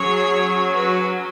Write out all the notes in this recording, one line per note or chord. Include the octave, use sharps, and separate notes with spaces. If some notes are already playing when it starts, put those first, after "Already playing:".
Already playing: F#3 C#4 G#4 C#5
F#4 B4